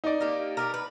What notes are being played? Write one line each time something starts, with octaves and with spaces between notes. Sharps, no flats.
D#4 D5
A#3 G4
G4 G#4 A#4
B4